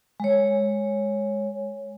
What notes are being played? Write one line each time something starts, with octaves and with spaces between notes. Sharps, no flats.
G#3 C#5